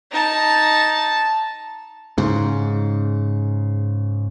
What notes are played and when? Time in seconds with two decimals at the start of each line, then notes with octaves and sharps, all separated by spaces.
0.12 D#4 A5
2.18 G#2 C#3